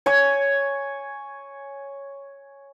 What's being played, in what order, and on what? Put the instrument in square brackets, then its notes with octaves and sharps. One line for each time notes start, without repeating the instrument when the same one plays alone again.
[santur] C#5 G#5